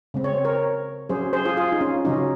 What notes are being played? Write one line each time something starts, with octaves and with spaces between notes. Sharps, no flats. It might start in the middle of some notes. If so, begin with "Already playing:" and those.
C#3 G#3 C4
C#5
C5
A#4 C#5
F#3 C#4 G#4 C5
G#4 C5
F4 G#4
F4 G#4
D#4
C#4 F4
C#3 F#3 C#4 D#4